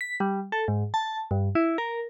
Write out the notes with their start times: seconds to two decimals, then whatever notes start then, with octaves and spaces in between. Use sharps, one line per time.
0.01 B6
0.20 G3
0.52 A4
0.68 G#2
0.94 A5
1.31 G2
1.55 E4
1.78 A#4